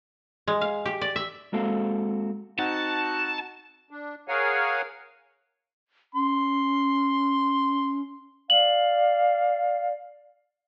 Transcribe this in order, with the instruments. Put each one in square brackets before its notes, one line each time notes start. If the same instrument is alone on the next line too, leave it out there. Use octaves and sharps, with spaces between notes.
[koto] G#3
F5
G4
D5
E5
[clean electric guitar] G#3 A#3 C4 F#4 A4 F5
[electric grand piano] C4 D#4 F#5 [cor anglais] F#4 [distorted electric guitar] A5
[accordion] D4
G#4 A#4 C#5 F5 F#5 G#5
[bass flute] C#4 [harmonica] C6
[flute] D5 [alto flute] F5 [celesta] F#7